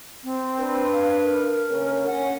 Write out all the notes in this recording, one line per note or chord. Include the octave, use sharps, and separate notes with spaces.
C4
D4 B4
F5
A#4
C#3 A#3 C#4
C#4 F#5